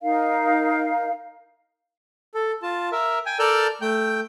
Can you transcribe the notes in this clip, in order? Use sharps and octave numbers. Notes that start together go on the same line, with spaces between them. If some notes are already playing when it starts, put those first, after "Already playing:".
D#4 A#4 F5
A4
F4 A5
A#4 E5
G5 G#5
A4 A#4 D5 E6 F6 G6
A3 G5 G6